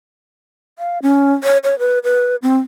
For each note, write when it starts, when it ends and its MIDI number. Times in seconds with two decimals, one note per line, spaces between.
0.79 0.99 77
1.02 1.32 61
1.44 1.58 73
1.64 1.78 73
1.79 1.99 71
2.04 2.36 71
2.42 2.59 60